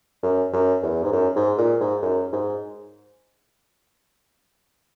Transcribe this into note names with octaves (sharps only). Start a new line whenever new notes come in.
F#2
F#2
E2
G#2
F#2
G#2
A#2
G#2
F#2
G#2